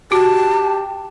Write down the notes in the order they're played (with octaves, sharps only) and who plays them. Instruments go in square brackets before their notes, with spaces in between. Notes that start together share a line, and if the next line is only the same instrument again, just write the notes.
[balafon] F#4 [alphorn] G4 [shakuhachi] A5